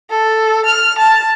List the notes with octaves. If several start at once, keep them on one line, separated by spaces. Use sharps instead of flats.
A4
F6
A5